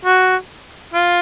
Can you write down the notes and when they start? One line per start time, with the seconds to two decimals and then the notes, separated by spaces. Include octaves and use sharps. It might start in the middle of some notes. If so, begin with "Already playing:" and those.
0.05 F#4
0.93 F4